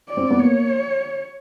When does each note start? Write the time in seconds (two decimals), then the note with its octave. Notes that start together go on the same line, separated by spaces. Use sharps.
0.09 D5
0.17 C4
0.31 B3
0.39 A#3 C#5